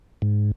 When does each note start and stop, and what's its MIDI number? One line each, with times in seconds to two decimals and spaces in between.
0.22 0.51 44